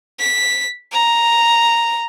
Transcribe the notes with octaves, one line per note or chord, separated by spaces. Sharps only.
B6
A#5